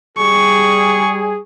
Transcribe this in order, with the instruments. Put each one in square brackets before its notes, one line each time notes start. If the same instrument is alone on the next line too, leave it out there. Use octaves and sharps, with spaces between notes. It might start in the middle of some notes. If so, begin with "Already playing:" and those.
[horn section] G3 G#4 [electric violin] C#6